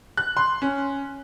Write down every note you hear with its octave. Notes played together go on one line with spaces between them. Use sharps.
F#6
C6
C#4